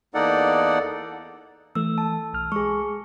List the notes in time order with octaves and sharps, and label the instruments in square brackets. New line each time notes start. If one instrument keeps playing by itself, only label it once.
[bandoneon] E2 A#3 D#4 A4 D5 F#5
[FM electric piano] E3 A3 [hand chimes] E6
[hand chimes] A5
[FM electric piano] B1 F6
[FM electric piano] G#3 [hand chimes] G#4 C#6